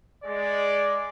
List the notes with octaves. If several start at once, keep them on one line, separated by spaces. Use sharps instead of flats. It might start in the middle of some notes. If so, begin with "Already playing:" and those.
G#3 D5